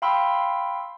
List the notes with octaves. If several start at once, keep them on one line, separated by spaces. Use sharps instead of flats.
F5 G5 B5 C6 E6